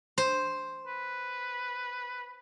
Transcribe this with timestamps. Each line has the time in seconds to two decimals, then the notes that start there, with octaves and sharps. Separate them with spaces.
0.18 C5
0.87 B4